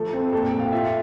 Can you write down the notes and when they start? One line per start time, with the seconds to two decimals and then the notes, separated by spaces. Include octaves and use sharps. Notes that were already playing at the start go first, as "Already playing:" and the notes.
Already playing: F3 A3 A4
0.13 C4
0.33 A#2 A4
0.46 G5
0.53 A3
0.59 F5
0.72 F4 E5